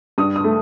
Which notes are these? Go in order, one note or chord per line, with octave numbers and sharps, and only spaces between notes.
G2 D#6
D#6
A3